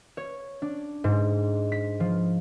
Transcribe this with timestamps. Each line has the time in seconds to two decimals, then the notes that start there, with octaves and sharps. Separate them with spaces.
0.17 C#5
0.62 D4
1.04 G#2
1.72 B6
2.00 F3